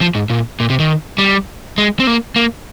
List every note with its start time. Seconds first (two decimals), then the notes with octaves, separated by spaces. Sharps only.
0.01 F3
0.15 G#2
0.30 A#2
0.60 A#2
0.70 C3
0.79 D#3
1.18 G3
1.78 G#3
2.00 C4
2.07 A#3
2.36 A#3